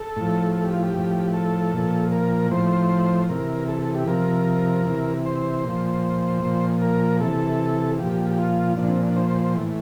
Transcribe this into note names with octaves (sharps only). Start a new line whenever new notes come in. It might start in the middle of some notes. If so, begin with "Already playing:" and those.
Already playing: A4
A2 F3
A4
G4
F4
G4
A2 F3
A4
A#2 F3
A#4
A2 F3 C5
C3 E3 A#4
A4
A4
G4
C3 F3 A#4
C3 E3
C5
A#2 F3
A#2 F3
A#4
C3 E3 A4
A#2 F3 G4
G4
F4
A#2 F3 D4
C4
D4
C5
C5
C5
A2 E3